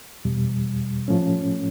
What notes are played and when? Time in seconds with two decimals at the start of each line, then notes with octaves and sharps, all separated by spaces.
0.25 E2 B2 G3
1.08 A2 F3 A3 C#4